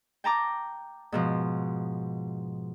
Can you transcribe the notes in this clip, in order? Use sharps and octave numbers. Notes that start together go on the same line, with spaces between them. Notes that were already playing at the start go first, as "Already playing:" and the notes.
G5 A5 A#5 D6
G#2 B2 F3